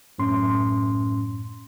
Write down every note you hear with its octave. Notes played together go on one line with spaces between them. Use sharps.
F#2 A2 C#4 C6